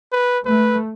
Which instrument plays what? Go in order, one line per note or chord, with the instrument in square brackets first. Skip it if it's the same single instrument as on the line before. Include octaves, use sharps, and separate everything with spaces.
[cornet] B4
[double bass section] A3 [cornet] B4